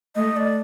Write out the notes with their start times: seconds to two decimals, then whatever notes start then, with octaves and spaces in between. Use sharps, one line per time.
0.16 A3 D#5
0.36 D5